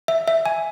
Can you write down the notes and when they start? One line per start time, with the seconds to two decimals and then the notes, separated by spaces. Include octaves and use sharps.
0.08 E5
0.28 E5
0.46 G#5